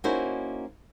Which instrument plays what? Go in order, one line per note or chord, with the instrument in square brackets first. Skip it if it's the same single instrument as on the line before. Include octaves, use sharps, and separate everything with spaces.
[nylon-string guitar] A#3 C#4 D#4 E4 F#4 C5